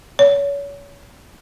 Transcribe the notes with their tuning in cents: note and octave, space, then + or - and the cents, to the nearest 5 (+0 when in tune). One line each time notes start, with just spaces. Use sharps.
C#5 +35